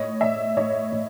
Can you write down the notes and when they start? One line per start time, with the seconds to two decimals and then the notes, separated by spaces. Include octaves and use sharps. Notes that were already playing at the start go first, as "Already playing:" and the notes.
Already playing: A2 C#5 D#5
0.21 A2 D5 E5
0.57 A2 C#5 D#5
0.92 A2